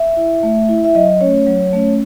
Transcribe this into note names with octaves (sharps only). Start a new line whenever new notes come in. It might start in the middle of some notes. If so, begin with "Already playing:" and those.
Already playing: E5
E4
A3
E4
E5
F#3 D#5
A3 C#4 C#5
F#3
A3 C#4